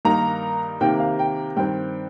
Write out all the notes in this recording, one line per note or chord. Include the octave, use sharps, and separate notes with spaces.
G2 D#3 A#3 D#4 A#5
C3 D#3 A#3 G5
F5
G5
G2 D#3 C4 G5